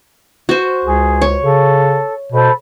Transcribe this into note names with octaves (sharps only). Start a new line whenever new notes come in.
F#4 C5
C#2 G#4
C#5
C#3 A4
B2 A4 C5 B5